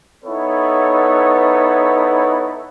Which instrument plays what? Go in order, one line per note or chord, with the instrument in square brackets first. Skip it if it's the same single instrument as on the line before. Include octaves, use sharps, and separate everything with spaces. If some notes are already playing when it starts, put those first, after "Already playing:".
[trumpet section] B3 D#4 E4 A4 B4 C#5